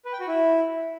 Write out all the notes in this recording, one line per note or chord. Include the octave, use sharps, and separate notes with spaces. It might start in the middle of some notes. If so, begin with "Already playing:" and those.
B4
G5
F#4
E4